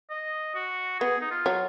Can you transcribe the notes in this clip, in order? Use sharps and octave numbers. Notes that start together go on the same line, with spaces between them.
D#5
F#4
B3 G#4
D#4
F4
F#3